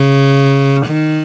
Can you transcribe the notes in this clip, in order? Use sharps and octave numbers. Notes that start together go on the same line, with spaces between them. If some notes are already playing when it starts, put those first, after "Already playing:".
Already playing: C#3
D#3